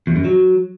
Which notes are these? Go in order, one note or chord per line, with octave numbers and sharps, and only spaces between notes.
E2
F#2
F#3